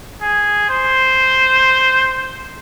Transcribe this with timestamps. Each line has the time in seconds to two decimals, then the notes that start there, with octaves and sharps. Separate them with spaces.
0.21 G#4
0.69 C5